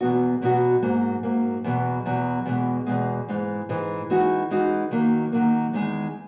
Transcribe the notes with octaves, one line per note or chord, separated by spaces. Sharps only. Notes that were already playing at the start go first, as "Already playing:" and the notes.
E2 B2 F#3 B3 F#4
E2 B2 F#3 B3 F#4
G#2 F#3 A#3
G#2 F#3 A#3
E2 B2 F#3
E2 B2 F#3
E2 B2 G#3
E2 B2 G#3
G#2 E3 G#3
G#2 E3 G#3
E3 G#3 D#4 F#4
E3 G#3 D#4 F#4
D#3 F#3 A#3
D#3 F#3 A#3
E2 D#3 G#3